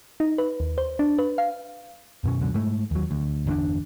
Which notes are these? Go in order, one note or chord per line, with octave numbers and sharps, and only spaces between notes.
D#4
B4
D#2
C5
D4
B4
F5
F#2 B2 C#4
C#2 F#2 B2 D3
G#2 A3
D#2 F#3
D2
G1 E2 C#4 D4